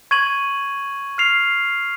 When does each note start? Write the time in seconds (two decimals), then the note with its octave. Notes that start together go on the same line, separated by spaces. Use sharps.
0.11 C#6 G#6 D#7 F#7
1.18 F6 C7 F7